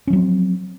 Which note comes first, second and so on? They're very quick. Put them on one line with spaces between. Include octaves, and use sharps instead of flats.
C#4 F3 F#3 C4